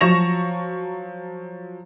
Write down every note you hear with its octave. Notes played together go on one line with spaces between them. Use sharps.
F3 F#3 C#6 A#6 E7 F7